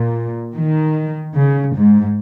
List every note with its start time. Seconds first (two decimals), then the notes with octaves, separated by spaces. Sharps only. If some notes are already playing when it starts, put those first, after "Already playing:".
Already playing: A#2
0.54 D#3
1.35 C#3
1.75 G#2